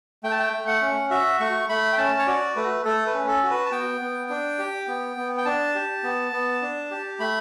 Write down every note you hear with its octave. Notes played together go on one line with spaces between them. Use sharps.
A3 G5
A5
G5
A3
F#5
C#4
F#4 E5
A3 C#6
A3 B5
G5
C#4 A5
C#5
F#4 D5
A3 B4
A3 A4
B4
C#4
A4
F#4
B4
A5
B3 G5
B3
D4
G4
B3
B3
G5
D4 A5
G4
B3
B3
D4
G4
A3 B5